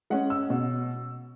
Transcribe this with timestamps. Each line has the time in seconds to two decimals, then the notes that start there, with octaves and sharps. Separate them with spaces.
0.10 G#3 C#4 F#5
0.30 E6
0.50 B2